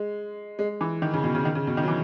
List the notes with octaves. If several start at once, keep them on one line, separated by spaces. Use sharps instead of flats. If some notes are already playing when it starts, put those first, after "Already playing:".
Already playing: G#3
G#3
E3
D#3
C#3
B2
C#3
D#3
C#3
B2
D#3
F#3
E3